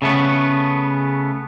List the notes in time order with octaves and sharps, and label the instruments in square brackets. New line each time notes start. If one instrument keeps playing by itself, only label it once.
[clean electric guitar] C#3 A3 B3